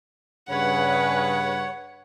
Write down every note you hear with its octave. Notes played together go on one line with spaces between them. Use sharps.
G2 C#3 B4 C#5 F#5